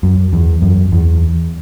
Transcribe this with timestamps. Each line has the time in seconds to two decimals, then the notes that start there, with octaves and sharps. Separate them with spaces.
0.03 F#2
0.33 E2
0.62 F#2
0.92 E2